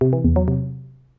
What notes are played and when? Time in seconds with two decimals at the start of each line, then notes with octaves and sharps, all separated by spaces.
0.01 C3
0.13 E3
0.24 E2
0.36 F#3
0.48 C3